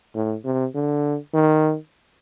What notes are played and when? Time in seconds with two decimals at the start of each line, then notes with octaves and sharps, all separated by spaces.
0.15 A2
0.45 C3
0.75 D3
1.34 D#3